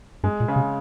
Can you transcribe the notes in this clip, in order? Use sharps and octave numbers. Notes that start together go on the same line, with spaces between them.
G2 G#3
A#2
C#3
C3